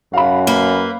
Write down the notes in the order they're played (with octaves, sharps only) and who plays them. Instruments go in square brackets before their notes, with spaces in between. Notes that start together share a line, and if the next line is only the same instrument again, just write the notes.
[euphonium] F#2 [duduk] F#4 [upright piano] F5 B5
[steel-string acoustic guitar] A#3 [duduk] B4